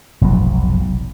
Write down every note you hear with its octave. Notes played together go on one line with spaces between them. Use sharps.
F1 B1 G#2 F#3